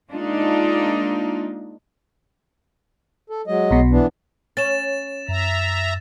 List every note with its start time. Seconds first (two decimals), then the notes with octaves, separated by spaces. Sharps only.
0.10 G#3 A#3 D4 D#4 F4
3.30 A4
3.47 F#3 G#3 D#5
3.71 B1 B2
3.91 E3 B3 D4
4.57 C#4 A6 E7
5.29 F#2 E5 A#5